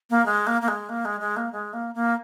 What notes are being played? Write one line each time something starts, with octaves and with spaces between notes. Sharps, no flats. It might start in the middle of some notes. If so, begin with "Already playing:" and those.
A#3
G#3
A#3
A#3
G#3
A#3
G#3
G#3
A#3
G#3
A#3
A#3